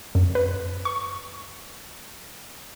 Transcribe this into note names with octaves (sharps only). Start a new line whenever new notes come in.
F#2
B4
C#6